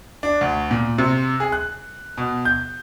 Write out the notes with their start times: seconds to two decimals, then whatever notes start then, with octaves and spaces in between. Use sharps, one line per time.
0.23 D4
0.41 D2
0.71 A#2
0.98 C3
1.40 G#4
1.52 F#6
2.17 B2
2.45 G6